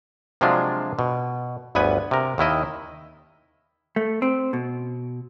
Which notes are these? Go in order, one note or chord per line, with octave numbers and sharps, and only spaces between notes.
C3 F3 F#3 G#3 D4 F4
B2
G1 D2 B3 B4 G#5
C3 A#4
D#2 D#3 E4 D#5
A3
C4
B2